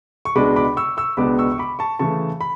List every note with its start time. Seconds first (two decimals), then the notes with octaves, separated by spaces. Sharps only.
0.25 C#6
0.35 C#2 B2 G#3 B3 D4 B5 D6
0.56 B5 D6
0.77 C#6 E6
0.97 C#6 E6
1.17 C#2 B2 G#3 B3 D4 B5 D6
1.39 C#6 E6
1.52 C#6
1.58 B5 D6
1.79 A5 C#6
1.99 C#3 E3 A3 A5 C#6
2.41 B5